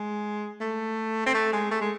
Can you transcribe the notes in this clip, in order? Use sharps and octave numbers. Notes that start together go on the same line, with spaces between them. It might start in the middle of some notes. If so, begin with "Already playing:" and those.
Already playing: G#3
A3
C4
A3
G#3
A3
G#3